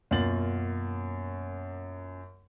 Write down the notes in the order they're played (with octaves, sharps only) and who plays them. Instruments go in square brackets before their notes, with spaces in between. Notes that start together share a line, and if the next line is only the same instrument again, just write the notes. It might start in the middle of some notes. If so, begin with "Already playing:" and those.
[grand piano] F#2 B2 A#3 F4 A6 F#7